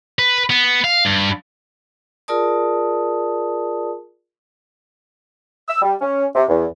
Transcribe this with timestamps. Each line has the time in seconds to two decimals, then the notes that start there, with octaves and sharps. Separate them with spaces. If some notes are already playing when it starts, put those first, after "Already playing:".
0.19 B4
0.50 B3
0.84 F5
1.05 G2
2.28 F4 G#4 A#4 D5 A5 D#6
5.67 E6
5.82 G3
6.01 C#4
6.35 C3
6.48 E2